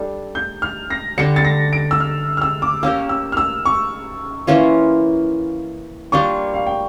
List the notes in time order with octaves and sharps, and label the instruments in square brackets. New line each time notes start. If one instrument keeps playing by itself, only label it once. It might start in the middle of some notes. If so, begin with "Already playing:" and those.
Already playing: [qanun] G3 D4 A4
[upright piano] G6
F6
A#6
[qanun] D3 G3 D4 [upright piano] C#7
[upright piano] A6
A#6
D7
E6
F6
F6
E6
D6
[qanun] A#3 C#4 G4 A#4 [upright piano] E6
[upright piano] E6
F6
E6
C#6
[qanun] E3 A#3 C#4 F4
[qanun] G3 A#3 D4 F4 [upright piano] C#6
[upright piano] F5
G5